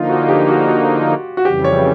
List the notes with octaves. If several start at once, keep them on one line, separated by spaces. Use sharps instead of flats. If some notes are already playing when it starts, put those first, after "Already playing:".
Already playing: D3 F3 A#3 D#4 F4
F#4
G4
F#4
F#4
F#4
F2 C#3 E3 G3 G4
C#5